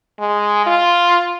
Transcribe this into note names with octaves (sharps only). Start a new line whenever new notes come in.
G#3
F4